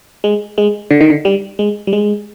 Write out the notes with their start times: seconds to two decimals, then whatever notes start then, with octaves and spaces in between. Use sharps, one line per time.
0.24 G#3
0.58 G#3
0.91 D3
1.01 D#3
1.10 D3
1.25 G3
1.59 G#3
1.87 G3
1.93 G#3